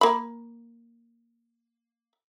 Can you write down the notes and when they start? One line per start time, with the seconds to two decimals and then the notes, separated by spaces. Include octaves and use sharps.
0.01 A#3 B5